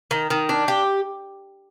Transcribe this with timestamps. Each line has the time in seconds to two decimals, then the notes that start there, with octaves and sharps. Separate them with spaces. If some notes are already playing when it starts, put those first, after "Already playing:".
0.11 D#3
0.30 D#3
0.49 D4
0.68 G4